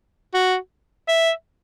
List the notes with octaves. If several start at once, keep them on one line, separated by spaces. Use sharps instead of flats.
F#4
E5